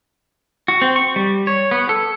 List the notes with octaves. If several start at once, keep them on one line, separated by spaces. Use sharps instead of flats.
F#4
C4
C#6
G3
C#5
B3
A4